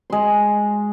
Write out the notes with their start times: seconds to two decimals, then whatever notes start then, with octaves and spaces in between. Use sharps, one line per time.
0.10 G#3 C6